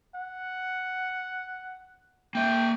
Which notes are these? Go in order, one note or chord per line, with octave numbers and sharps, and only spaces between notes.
F#5
A#3 E5 G5